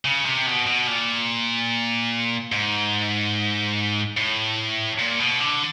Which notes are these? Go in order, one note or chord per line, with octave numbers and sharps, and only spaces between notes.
C#3
C3
B2
B2
A#2
G#2
A2
A#2
B2
D3